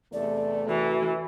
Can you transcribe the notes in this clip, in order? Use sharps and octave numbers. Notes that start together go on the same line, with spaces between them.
E2 C3 A3 D5
E3 F#4